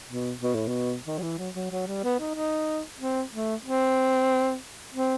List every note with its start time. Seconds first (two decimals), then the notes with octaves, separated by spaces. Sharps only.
0.10 B2
0.43 B2
0.55 A2
0.68 B2
1.07 D#3
1.19 F#3
1.22 E3
1.38 F#3
1.55 F#3
1.71 F#3
1.88 G3
2.04 B3
2.20 D#4
2.35 D#4
3.00 C4
3.33 A3
3.65 C4
4.94 C4